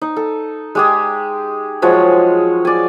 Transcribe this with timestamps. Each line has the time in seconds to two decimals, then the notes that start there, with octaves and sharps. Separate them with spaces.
0.02 D#4
0.16 A4
0.75 G#3 G4 G#4
1.82 F3 F#3 G#3 C#5
2.65 D5 G#5